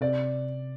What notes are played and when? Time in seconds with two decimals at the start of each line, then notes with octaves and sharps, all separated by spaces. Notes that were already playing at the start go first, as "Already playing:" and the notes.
0.01 C3 D5